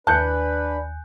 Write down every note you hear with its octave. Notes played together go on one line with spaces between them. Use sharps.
D#2 D4 B4 G#5 A5 F#6 G6 C#7